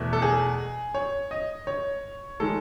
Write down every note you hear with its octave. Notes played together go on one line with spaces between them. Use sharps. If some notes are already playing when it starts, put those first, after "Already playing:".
Already playing: E2 B2 A3
A4
G#4
C#5
D#5
C#5
D#3 G#3 A4